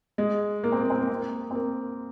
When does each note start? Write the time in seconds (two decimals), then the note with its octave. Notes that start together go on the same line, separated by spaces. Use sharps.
0.18 G#3
0.64 A#3
0.72 C4
0.82 A#3
0.90 C4
0.99 A#3
1.08 C4
1.17 A#3
1.51 C4
1.55 A#3